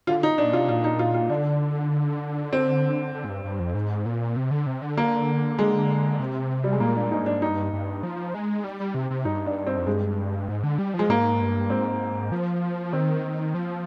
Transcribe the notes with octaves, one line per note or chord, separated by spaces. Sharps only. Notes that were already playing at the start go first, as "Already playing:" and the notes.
D3 F4
D#4
A#2 D4
C3 F4
A#2 F4
D#4
F4
F4
D3 D4
C4
D3
G#2
G2
G2
F2
G#2
A#2
C3
D3
C3
D3
A#3
G#3
C3
G3
G#3
A#2 A#3
D4
G#2 D#4
D4
G2 D#4
G2
F3
G#3
G3
G3
C3
C3
G2 D#4
D4
C4
F2
G2 G#3
G#2
D3
G3
F3
G#3
G#2 A#3
G2
G#2 C4
F3
D#3 C4
F3